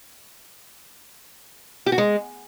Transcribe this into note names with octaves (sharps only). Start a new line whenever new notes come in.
G4
F#4
G#3